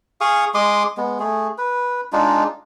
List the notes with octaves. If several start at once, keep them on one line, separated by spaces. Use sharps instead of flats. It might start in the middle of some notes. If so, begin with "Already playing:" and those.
G#4 F5 C#6 D#6
G#3 C6 D6 D#6
G#3 B3
A3 G#4
B4
G#3 D4 D#4 F4